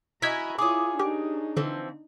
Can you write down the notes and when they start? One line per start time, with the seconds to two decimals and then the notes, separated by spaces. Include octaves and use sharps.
0.22 E4 F#4 D#5 G#5 A#5 F6 G#6 B6
0.58 E4 F4 G#4 C#5 D6 D#6
0.99 D4 D#4 G4 A#4
1.57 D3 E3 F3 C4